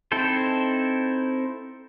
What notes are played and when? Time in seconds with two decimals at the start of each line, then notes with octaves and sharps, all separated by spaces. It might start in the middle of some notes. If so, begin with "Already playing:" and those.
0.12 C4 D#4 E4 A4 C5